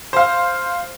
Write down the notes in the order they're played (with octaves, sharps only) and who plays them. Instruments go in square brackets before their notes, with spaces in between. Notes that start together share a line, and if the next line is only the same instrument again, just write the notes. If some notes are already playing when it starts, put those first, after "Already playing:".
[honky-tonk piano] C5 F5